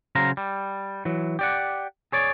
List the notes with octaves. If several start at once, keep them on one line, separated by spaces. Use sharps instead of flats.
C#3 F#3 C5 F5 A#5
G3
E3 F#3
G4 D5 F#5
G#4 C#5 D5